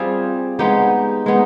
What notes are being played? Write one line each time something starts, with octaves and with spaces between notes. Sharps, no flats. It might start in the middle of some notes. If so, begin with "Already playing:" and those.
Already playing: G3 C4 F4 G#4
G#3 B3 D#4 G4
G#3 B3 D#4